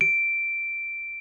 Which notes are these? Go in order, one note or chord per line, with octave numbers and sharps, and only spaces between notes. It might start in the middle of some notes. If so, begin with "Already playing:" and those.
D7